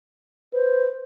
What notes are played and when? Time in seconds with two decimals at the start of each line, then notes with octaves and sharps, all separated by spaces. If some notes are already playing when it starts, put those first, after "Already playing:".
0.53 B4 C5